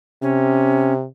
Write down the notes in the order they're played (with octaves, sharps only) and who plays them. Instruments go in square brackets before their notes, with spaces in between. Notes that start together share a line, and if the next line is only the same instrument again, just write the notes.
[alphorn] C3 [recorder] C#4